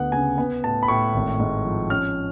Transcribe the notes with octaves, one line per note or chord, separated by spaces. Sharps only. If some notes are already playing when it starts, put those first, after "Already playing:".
Already playing: D2 B3 F#5
C#3 G#5
B3
A2 A5
B5
A2 C#6
G#1
G#2
F3
C#4 F6